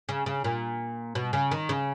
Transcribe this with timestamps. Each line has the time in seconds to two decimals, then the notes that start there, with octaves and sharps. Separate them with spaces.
0.09 C#3
0.26 C#3
0.44 A#2
1.15 B2
1.33 C#3
1.51 D#3
1.69 C#3